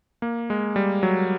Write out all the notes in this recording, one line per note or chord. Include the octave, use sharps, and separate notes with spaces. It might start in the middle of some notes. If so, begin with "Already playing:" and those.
A#3
G#3
G3
F#3